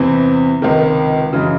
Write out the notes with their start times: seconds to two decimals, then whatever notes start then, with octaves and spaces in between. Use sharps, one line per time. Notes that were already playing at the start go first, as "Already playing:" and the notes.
Already playing: E2 C3 E3 C4
0.62 C#2 C3 D#3
1.33 F#2 C#3 E3 G#3